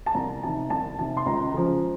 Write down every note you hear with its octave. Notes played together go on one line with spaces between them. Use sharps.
A5
C2 A#5
C3 D#3 A5
C2 A5
C3 D#3 A5
C6
C#2 A#5
C#3 F3